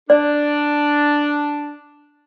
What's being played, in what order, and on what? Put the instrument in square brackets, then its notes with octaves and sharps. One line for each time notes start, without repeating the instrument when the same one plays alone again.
[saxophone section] D4 [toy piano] D5